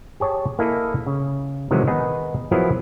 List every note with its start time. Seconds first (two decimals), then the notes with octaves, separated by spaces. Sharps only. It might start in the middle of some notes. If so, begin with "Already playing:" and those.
0.20 G4 G#4 C#5 A5
0.59 A#3 E4 G#4 A4 D#5
1.07 C#3
1.71 C3 D#3 E3 F#3 G#3
1.87 D#3 B3 D#4 G#4 B4
2.51 F3 F#3 B3 E4 G#4 A#4